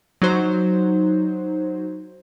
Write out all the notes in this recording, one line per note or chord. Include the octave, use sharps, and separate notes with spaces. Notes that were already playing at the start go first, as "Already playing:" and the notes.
F#3 D#4 F#4 C5